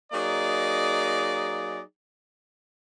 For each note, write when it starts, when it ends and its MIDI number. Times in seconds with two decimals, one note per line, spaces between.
0.13 1.81 54
0.13 1.81 58
0.13 1.81 63
0.13 1.81 68
0.13 1.81 74
0.13 1.81 75